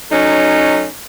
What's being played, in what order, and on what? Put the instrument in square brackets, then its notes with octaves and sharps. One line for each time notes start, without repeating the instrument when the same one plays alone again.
[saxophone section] F#3 A3 C#4 D#4